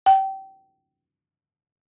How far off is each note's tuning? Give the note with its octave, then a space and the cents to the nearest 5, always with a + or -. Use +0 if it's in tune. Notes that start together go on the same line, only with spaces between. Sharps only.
G5 -25